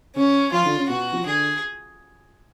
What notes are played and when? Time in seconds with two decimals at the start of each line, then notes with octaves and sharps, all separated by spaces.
0.16 C#3 C#4
0.52 F3 F4
0.65 D3
0.77 C#3
0.89 B2 F#4
1.14 F3
1.26 D3 G#4